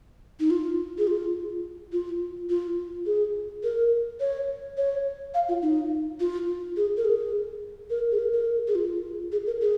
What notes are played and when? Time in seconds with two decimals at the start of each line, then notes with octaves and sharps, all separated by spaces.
0.40 D#4
0.50 F4
0.98 G#4
1.07 F4
1.92 F4
2.50 F4
3.06 G#4
3.63 A#4
4.20 C#5
4.77 C#5
5.34 F5
5.49 F4
5.62 D#4
6.20 F4
6.77 G#4
6.97 A#4
7.05 G#4
7.90 A#4
8.12 G#4
8.19 A#4
8.33 A#4
8.68 G#4
8.75 F4
9.32 G#4
9.47 A#4
9.61 G#4